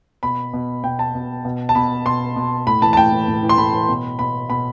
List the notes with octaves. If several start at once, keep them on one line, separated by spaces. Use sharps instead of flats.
B2 B5
B2
B2 G5
A5
B2
B2
A5
B2 B5
B2 C6
B2
A2 B5
E3 A5
A5
A2 G5
E3
A2
E3
C6
A2 B5
E3
B2
B2 B5
B2 B5